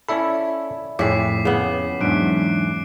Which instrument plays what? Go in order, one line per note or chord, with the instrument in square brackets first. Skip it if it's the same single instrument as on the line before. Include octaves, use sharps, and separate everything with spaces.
[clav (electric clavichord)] C#4 E4 A4 [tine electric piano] D5 E5 B5
[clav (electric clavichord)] F2 [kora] A2 G#4 [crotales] D6 B6 C7
[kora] C#3 B3 [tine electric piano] G#4
[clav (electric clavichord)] E2 G#2 [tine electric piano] F#3 D4 [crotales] F#6 D7